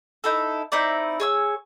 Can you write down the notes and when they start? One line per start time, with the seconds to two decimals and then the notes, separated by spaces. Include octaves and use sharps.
0.24 D#4 E4 A4
0.72 C4 D#4 E4 D5
1.20 G#4 C#5 E6